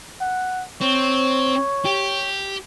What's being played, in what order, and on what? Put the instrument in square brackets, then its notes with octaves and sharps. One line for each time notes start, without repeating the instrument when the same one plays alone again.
[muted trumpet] F#5
[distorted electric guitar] C4 [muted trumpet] C#5
[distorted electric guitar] G4